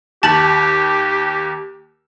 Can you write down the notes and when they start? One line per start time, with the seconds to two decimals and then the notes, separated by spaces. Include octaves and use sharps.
0.23 D#2 G4 A5 A6 F#7